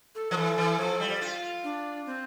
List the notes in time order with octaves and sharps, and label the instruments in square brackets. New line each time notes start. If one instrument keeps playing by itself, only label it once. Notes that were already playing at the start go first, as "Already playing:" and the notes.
[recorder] A4
[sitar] F3 [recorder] B4
[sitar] E3 [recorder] A4
[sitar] E3
[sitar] F3 [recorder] A4
[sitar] G3
F4
[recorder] D4
C4